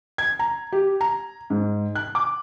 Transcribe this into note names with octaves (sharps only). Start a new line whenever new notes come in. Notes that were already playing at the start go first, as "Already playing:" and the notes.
G#6
A#5
G4
A#5
G#2
F#6
D6